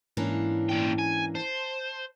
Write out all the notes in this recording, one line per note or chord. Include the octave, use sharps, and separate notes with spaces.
G#2 E3 A#3 C#4 D4
A#2 G5
G#5
C5 A5